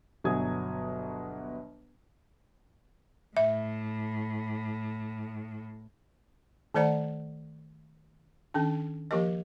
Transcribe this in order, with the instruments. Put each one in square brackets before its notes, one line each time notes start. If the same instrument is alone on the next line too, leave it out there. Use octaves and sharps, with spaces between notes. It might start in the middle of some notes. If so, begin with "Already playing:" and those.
[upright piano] G1 B2 F#3 G#5 D#6 G#6
[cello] A2 [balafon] E5
[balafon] D#3 A3 C5 D5 F#5 A#5
D#3 C#4 D4
F3 A#3 G4 A#4 D#5